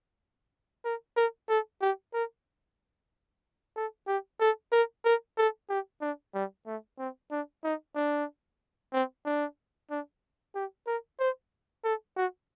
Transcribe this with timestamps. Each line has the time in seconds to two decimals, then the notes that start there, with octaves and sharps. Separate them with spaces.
0.85 A#4
1.16 A#4
1.49 A4
1.81 G4
2.14 A#4
3.76 A4
4.07 G4
4.40 A4
4.72 A#4
5.05 A#4
5.37 A4
5.69 G4
6.01 D4
6.34 G3
6.66 A3
6.99 C4
7.31 D4
7.64 D#4
7.95 D4
8.93 C4
9.25 D4
9.90 D4
10.55 G4
10.87 A#4
11.19 C5
11.84 A4
12.16 F#4